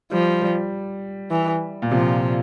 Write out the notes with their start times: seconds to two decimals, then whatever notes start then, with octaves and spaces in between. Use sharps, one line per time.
0.11 F3 G3
0.42 G3
1.31 E3
1.82 A#2
1.91 C3 F3